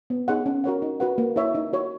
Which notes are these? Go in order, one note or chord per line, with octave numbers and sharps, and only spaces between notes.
B3
D#4 G#4 C#5 F#5
C#4
F#4 A#4 C#5 F#5
D#4
F#4 B4 F#5
A#3
E4 A#4 C#5 E5
D#4
F#4 C#5